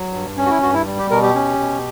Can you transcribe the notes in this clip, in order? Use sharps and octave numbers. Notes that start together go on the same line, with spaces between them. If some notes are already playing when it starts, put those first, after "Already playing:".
Already playing: F#3
G2
C#4
F#4
E4
G2 F#4
E4
G3
G4
B2 A#4
G4
C#4
B2